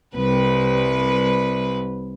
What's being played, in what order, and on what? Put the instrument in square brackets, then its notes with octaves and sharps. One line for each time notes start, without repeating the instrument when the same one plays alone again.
[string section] C2 B4